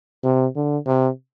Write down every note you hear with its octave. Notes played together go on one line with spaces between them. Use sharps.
C3
D3
C3